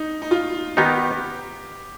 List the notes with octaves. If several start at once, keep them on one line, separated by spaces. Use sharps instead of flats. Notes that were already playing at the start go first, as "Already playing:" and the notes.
Already playing: D#4
D#4
F4
D#3 B3 D#4 G4